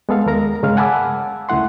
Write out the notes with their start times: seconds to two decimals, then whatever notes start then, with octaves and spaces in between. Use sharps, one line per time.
0.09 G#3 B3 A4 F5
0.26 D#2 G#3 A#4 A#5
0.63 G2 C#3 G#3 C#4 F5 F6
0.77 F#5 G#5 A5 B5 D6 E6
1.49 C#2 C#3 A3 E4 F#5 C6